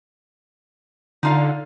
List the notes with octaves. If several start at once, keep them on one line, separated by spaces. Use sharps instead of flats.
D3 D#4 F4 F5